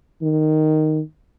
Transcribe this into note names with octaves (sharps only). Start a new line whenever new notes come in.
D#3